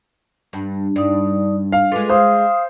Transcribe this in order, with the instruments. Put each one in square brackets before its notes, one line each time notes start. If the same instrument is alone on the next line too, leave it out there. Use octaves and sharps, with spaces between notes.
[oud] G2
[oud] G2 [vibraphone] D#4 D5
[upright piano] F5
[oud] G#3 F4 [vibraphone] A4 B4 D6
[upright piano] C5 [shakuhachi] F5 [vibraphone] D#6